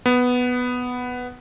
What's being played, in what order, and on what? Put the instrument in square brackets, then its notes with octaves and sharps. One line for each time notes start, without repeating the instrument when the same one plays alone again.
[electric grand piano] B3